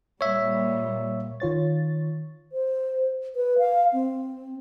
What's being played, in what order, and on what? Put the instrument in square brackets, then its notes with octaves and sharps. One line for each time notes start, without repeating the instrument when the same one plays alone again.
[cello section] A#2 G3 [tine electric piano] C#5 E5
[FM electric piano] D#3 F4 C#5 A6
[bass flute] C5
B4
F5
C4